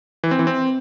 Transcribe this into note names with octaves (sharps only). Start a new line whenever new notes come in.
E3
C4
E3
C4